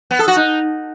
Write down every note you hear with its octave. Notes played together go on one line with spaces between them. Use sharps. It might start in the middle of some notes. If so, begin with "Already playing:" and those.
B3
A4
F#4
D#4